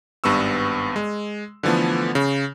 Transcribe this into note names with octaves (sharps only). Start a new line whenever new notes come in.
G#1 G2 B3 C#6 E6
G#3
D3 E3 F3 A3 B3
C#3